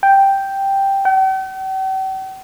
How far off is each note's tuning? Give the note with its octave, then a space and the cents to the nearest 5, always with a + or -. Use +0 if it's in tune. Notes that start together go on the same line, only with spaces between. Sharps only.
G5 +0
G5 -45